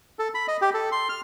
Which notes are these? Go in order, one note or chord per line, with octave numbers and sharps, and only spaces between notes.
A4
B5
D#5
G4
A4
C6
F6